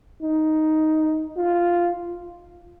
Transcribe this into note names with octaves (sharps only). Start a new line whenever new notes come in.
D#4
F4